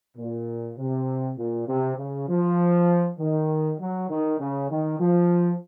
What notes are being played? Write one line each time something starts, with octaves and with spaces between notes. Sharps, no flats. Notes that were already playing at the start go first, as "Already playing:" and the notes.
A#2
C3
A#2
C3
C#3
F3
D#3
F#3
D#3
C#3
D#3
F3